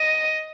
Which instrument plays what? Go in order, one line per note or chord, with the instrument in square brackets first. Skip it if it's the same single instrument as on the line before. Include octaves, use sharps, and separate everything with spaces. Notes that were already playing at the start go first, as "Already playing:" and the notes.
Already playing: [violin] D#5